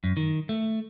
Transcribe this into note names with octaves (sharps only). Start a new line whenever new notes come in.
F#2
D#3
A3